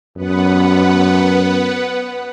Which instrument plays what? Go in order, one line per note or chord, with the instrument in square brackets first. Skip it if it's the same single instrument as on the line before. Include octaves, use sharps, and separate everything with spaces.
[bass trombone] F#2 [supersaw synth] B3 B4 F#5